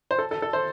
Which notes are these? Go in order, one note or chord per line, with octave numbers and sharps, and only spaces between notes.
C5
A4
A4
A4
C5